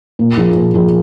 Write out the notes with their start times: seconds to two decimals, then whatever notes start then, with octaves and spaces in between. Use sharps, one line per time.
0.19 A#2
0.37 F3 A#3 F4 G#4
0.55 A#2
0.74 F3 A#3 F4 G#4